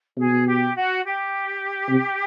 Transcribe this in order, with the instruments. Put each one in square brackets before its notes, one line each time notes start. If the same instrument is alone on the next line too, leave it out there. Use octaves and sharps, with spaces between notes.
[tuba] B2 [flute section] G#4
[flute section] G4
F#4
G4
[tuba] C3